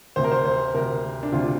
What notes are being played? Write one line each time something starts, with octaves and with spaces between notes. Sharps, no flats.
D2 C3 C5
A#4
C5
C5
D2 C3 A#4
D4
D2 C3 F4